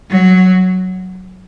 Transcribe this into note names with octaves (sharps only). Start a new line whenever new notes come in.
F#3